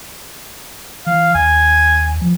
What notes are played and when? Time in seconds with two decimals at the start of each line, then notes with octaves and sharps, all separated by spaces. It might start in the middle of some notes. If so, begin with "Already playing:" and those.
1.06 E3 F5
1.35 D#2 G#5
2.21 F3